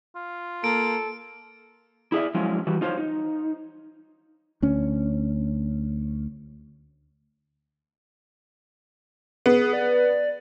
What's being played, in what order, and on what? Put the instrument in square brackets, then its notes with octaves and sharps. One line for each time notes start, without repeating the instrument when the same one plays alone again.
[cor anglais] F4
[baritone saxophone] A#3 [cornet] A4 [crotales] D7
[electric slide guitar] E4 G#4 D5 E5
F3 F#3 G#3 C#4 E4 F4
E3 G3 F#4
D#4 F4 A4 C5 C#5
D#4
[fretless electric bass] D2 C#4
[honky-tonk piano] B3 [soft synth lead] G#4
[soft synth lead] D5